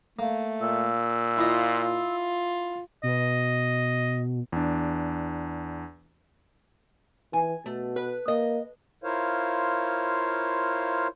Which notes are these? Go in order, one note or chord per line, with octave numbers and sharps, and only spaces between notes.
A3 A#3
A#2 E6
E4 F4 D#5
B2 D#5
E2 D4
E3 G#5
B2 A3
B4
A#3 D#5
E4 F4 A#4 C5 C#5 F5